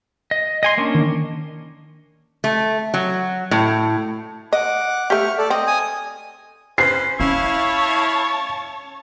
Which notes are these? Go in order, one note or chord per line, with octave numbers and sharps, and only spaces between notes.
D#5
D#5 G#5 C6
A#3 C#4 D4
D#3
A3
F#3
A2
D#5 F#5 D6
A3 G4 C#6 F6
A4 D5
C4 D#5
G#5 D#6
C#4 B4 C5 C7
C#4 E4 C#5 F5 A5